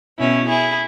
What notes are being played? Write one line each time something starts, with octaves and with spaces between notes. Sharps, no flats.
B2 C#4 E4
E4 G#4